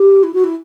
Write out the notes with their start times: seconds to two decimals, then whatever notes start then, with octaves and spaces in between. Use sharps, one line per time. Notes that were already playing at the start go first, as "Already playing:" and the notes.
Already playing: G4
0.23 E4
0.34 F#4
0.44 E4